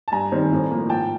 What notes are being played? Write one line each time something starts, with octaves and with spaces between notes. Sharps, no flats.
A5
G2 G#5 A#5
D#3 G3 C4
A2
F3 A#3
G#2 G5 A5